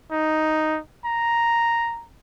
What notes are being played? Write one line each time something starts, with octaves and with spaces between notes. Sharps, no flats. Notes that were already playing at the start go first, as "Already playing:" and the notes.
D#4
A#5